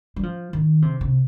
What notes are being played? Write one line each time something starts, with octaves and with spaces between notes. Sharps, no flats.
G3
F3
D#3
C3
C3